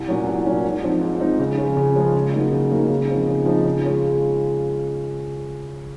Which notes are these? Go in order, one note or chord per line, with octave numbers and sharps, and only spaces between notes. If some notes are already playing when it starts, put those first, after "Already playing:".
Already playing: C2
A#2 F#3 C#4
C2
A#2 F#3 C#4
G#2
F3 C4 D#4
G#2
F3 C4 D#4
C#3
F3 G#3 C#4
C#3
F3 G#3 C#4
C#3
F#3 A#3 D#4
C#3
F#3 A#3 D#4
C#3
F3 C4 D#4
C#3
F3 C4 D#4
C#3
G#3 C#4 F4